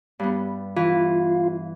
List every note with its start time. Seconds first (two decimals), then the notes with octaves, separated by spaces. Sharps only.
0.19 G2 B3
0.76 E3 F4